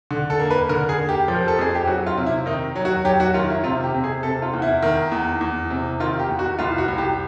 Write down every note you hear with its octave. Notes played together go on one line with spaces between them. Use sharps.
D3
A4
A#3
B4
D3 A#4
G#4
A#3
G4
F3
A#4
A4
F2 G#4
G4
F#3 F#4
F4
C3
E4
D#3 D#4
F#3
F#4
F#3 G4
F#4
D#3 F4
E4
C3 F4
G4
C3
G#4
C3 A4
F4
E2
E4
D#3
E2
E2
C3
D#3 F4
G4
E2
F#4
C2 F4
F#4
C2
G4